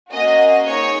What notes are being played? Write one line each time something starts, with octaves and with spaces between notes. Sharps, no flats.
A#3 C#4 F#4 D#5
A#3 D#4 G#4 C#5